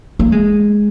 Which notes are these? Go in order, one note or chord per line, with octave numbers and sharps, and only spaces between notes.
A#3
G#3